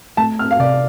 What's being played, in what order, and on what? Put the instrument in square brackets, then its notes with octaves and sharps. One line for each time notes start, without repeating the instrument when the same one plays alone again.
[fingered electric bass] A3 [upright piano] A5
[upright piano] F6
F5
[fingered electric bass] C3 [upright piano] D5